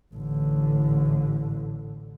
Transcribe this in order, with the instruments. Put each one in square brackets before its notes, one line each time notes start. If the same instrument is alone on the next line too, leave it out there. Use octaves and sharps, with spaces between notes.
[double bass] A1 D3